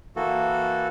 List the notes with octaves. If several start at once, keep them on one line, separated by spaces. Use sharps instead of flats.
E3 A#3 F#4 A4